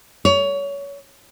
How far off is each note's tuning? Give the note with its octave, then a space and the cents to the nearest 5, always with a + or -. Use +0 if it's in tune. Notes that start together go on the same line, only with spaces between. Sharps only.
C#5 +25